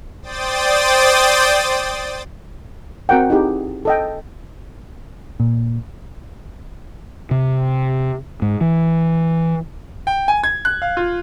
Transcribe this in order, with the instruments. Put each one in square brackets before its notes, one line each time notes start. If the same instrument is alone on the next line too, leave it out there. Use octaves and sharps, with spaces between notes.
[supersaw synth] C5 D5 G5 D#6 A6
[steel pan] C4 F#4 A#4 F#5 G5
D#4 E4 G4 G#4
A4 D#5 G5
[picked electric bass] A#2
[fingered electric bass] C3
G#2
E3
[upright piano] G5
G#5
G#6
F#6
F5
F4